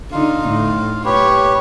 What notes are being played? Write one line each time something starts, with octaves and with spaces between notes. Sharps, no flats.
D3 D#4 F4 F5
A2
G4 B4 C#5